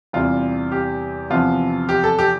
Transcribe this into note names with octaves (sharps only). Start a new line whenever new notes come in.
E2 C3 G3 F4
G4
E2 C3 F3 B3 F4
G4
A4
G4